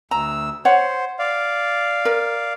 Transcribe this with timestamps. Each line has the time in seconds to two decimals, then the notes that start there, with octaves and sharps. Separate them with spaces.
0.11 D2 A#5 E6
0.65 C5 C#5 F#5
1.19 D5 F5
2.05 A#4